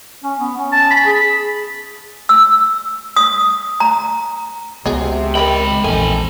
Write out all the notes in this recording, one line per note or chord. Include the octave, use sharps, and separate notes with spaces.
C#4
B3
C#4
A5
B5
G#4
E6
D#6
A#5
C#2 C3 F#3 B3 G#4 D#5
G#3 A#4 D#5 G5 B5
A#1 E2 D#3 C4 A4 G#5